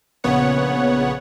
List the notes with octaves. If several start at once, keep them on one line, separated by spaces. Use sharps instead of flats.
A#1 C#3 B3 C#5 F#5